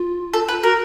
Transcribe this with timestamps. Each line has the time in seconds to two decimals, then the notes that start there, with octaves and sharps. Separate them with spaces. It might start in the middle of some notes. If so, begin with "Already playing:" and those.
Already playing: F4
0.33 A4
0.48 B4
0.63 F#4 A#4